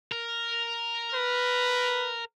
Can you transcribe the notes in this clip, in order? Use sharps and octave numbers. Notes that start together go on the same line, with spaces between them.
A#4
B4